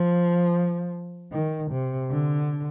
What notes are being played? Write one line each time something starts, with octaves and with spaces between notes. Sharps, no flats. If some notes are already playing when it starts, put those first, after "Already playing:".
Already playing: F3
D#3
C3
D3